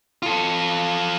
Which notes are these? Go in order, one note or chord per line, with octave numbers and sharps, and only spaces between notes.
F4 A4